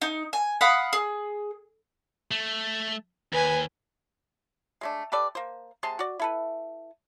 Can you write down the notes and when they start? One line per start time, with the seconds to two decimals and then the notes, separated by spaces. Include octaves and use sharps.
0.02 D#4
0.33 G#5
0.61 F5 F#5 B5 D#6
0.93 G#4
2.31 A3
3.33 D#2 B4 G#5
4.81 G#3 A3 D4
5.12 G4 A4 B4 D5
5.35 A#3 C5
5.83 C3 G#3 A5 C6
5.99 F#4 D5
6.20 E4 A4 B4